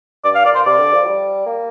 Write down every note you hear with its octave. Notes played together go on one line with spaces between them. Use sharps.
G2 D5
F5
A#2 D5
C5
C3 D5
D3
F3
G3
A#3